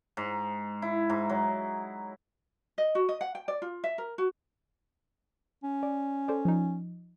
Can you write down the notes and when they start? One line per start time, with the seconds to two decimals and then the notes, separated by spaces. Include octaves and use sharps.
0.17 G#2
0.82 E4
1.09 G#2
1.30 F#3
2.78 D#5
2.95 F#4
3.09 D#5
3.21 F#5
3.35 G5
3.48 D5
3.62 F4
3.84 E5
3.98 A#4
4.18 F#4
5.64 C#4
5.83 D5
6.28 A4 C5 D5
6.45 F3 D#4